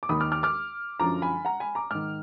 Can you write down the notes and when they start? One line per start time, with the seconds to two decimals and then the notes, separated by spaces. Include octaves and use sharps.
0.03 D6
0.09 D#2 D#3 B5 D#6
0.20 D6 F6
0.32 D6 F6
0.43 D6 F6
1.00 F#2 D3 F3 A#5 D6
1.22 G#5 B5
1.45 F#5 A#5
1.60 G#5 B5
1.75 A#5 D6
1.90 G#2 D#3 D6 F6